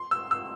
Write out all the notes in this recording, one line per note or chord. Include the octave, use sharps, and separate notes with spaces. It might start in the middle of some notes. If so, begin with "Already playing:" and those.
Already playing: C6
E6
E6